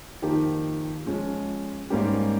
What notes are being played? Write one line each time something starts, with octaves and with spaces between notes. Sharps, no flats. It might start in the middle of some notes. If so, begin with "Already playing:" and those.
F2 D#3 A#3 D#4 G4
F3 G#3 C#4
G#2 G3 A#3 C#4 G4